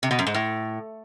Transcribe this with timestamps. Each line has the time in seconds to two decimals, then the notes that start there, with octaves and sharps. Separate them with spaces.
0.03 C3
0.11 B2
0.19 F#2
0.27 G#2
0.34 A2